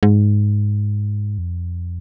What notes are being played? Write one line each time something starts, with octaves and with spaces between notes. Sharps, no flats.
G#2
F2